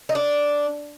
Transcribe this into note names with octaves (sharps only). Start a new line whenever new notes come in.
D#4
D4